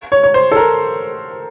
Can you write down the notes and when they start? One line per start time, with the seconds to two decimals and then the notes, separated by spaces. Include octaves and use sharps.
0.12 C#5
0.23 C#5
0.34 C5
0.52 A4
0.56 A#4